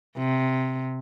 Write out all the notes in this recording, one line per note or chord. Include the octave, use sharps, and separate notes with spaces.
C3